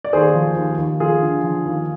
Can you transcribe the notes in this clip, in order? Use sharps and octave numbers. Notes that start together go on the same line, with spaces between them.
D5
D#2 G#4 C5
F3
D#2
D#2
F3 F4 G#4
D3
F3
D#2